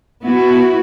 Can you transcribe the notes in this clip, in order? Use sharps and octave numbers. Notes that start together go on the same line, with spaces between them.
B3 E4 F#4